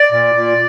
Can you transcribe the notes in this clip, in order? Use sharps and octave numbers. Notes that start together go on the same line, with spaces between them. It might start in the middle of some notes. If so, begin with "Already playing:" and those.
Already playing: D5
A#2
A#2